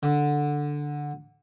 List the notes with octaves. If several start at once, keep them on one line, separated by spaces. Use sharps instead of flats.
D3